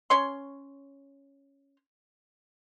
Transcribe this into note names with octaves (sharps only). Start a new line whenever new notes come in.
C#4 C#5 C6